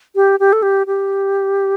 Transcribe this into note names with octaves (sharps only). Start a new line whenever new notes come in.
G4
G4
A4
G4
G4